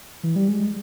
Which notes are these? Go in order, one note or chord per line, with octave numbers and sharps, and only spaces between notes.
E3
G3
G#3